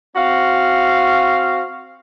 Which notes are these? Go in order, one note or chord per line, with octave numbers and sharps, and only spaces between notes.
C4 F#4 F5